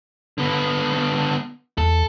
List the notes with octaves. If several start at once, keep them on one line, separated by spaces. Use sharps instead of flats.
D3 B3
E2 A4